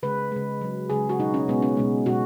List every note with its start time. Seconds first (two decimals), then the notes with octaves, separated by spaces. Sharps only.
0.03 C#3 G#3 B4
0.32 C#3 G#3
0.61 C#3 F#3
0.90 C#3 G#3 G#4
1.09 F#4
1.19 B2 F#3 D#4
1.34 C#4
1.48 B2 G#3 B3
1.62 C#4
1.77 B2 G#3
2.06 B2 G#3 F#4